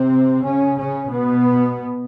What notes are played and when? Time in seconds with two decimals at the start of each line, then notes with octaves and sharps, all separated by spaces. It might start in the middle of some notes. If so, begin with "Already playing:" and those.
Already playing: C3 C4
0.44 C#3 C#4
0.77 C#3 C#4
1.11 B2 B3